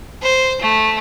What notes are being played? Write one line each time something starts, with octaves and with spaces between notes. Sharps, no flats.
C5
A3